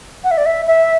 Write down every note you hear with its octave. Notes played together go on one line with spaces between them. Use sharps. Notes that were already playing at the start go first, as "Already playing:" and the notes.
F#5
E5
D5
E5
E5